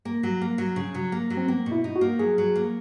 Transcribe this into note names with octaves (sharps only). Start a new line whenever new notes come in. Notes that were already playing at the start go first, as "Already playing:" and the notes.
A#3
F#3
A#3
F#3
C#3
F#3
A#3
F#3
C4
A#3 B3
B2
E4
D#4
F#4
A#3
F#3 G#4
F#3
A#3